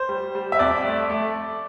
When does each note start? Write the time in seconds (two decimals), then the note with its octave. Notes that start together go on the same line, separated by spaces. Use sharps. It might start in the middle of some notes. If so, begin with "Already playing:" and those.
Already playing: C5
0.09 G3
0.35 G3
0.52 E5
0.59 F2 D5
0.85 A3
1.10 A3